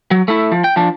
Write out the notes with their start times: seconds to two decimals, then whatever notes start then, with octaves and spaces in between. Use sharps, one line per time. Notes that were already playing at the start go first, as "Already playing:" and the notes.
0.11 F#3
0.28 A3 E4
0.52 F3
0.64 G5
0.76 F3 D4